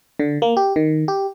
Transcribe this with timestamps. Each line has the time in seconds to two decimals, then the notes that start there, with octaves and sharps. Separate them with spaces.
0.19 D3
0.42 A#3
0.57 G4
0.76 D#3
1.08 G4